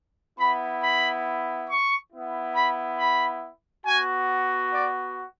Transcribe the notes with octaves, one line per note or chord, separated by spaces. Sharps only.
B3 E4 B5
B5
C#6
B3 E4
B5
B5
B3 F#4 G#5
D5